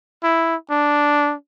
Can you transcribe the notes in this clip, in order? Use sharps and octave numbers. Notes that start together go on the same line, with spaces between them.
E4
D4